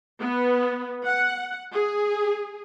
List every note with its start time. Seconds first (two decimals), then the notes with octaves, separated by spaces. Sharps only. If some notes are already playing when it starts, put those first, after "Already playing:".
0.19 B3
1.05 F#5
1.73 G#4